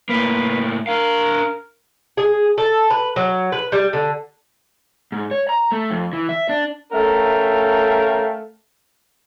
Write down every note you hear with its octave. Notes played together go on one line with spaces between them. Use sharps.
A2 A#3 B4
D4 A#4 F5
G#4
A4
B4
F#3
B4
G3
D3
G#2
C#5
A#5
A3
F2
E3
E5
D4
A3 C#4 A#4 E5 F5 G5